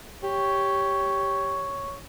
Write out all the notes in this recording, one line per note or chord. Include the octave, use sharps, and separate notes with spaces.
G4 C#5